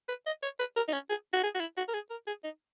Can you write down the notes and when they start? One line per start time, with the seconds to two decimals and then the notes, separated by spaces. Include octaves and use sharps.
0.09 B4
0.26 D#5
0.43 C#5
0.59 B4
0.76 A#4
0.88 D#4
0.93 C#4
1.09 G#4
1.33 F#4
1.43 G#4
1.54 F#4
1.60 E4
1.77 F#4
1.88 A#4
1.94 G#4
2.10 A#4
2.27 G#4
2.44 D#4